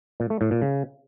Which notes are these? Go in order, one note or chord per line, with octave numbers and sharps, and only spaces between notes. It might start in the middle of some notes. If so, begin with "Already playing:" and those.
A#2
A3
A2
A#2
C#3